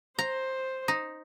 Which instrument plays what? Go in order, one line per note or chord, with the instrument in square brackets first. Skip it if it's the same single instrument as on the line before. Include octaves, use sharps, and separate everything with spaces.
[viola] C5 [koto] A#5
[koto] D#4